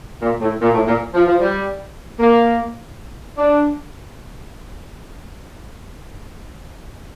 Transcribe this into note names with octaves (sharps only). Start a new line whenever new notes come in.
A#2
A2
A#2
A2
A#2
F3
F3
G3
A#3
D4